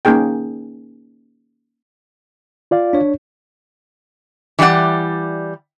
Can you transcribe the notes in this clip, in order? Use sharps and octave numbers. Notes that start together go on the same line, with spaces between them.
A#3 C#4 D#4 G#4 G5
F4 D5 F5
D4 C#5
E3 G3 G4 D5 F#5